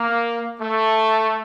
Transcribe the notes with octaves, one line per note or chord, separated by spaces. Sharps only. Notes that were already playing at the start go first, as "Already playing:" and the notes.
Already playing: A#3
A3